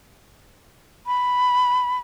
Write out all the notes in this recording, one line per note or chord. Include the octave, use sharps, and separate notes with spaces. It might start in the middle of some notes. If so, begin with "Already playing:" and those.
B5